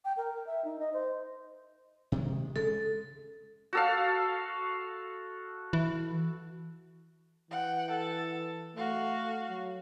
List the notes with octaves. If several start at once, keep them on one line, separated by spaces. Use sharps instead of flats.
G5
A#4
E5
D#4
D#5
C5
C3 D#3 G#3
C#3 G#3 A4
F#4 A4 F5
E3
E3 F#5 G5
A4
A3 F#4 F5
F#3